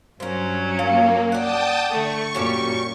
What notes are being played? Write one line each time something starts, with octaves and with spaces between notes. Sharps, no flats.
G2 F#3 C#4 A#4 C5
A#3 F4
D5 F#5 G5 A5 D#6
D3 A3 C#6
F#2 A#2 F#3 G3 C#4 G4